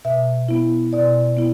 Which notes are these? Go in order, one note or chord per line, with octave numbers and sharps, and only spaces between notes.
B2 E5
B3 E4
B2 D5
B3 E4